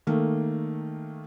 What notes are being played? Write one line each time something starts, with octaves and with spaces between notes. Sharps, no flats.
D#3 A3 A#3